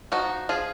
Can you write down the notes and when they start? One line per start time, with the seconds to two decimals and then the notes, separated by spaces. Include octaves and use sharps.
0.12 F3 D#4 F#4
0.49 F3 F4 G#4